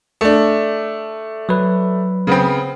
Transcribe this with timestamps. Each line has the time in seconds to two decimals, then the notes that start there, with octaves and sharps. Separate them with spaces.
0.21 A3 D4
1.49 F#3 B4
2.27 C#3 B3 C4